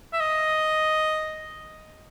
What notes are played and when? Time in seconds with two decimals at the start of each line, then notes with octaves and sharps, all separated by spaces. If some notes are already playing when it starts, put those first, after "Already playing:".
0.13 E5
0.20 D#5